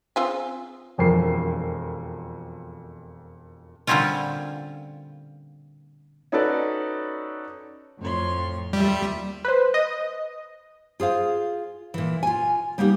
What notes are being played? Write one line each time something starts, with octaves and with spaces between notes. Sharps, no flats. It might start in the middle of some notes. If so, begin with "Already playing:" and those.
C4 F4 G#4
E1 F2 A#4 C7
A#2 D3 G3 C4 C#4 F4
C#4 D#4 F#4 A4 B4 D5
F2 A2 C#5 C6
D#2 G3 F4 E5
B4 C5
D#5
F4 G#4 C5 F5
A#2 E3
F4 G#5
G3 A#3 B3 D#4 F#4 G4